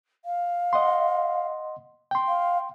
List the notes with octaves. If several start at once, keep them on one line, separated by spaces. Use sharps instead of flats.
F5
D#5 F#5 C6
G5 C6
F5